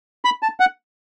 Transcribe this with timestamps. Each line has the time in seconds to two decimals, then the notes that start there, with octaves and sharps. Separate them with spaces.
0.25 B5
0.42 A5
0.60 F#5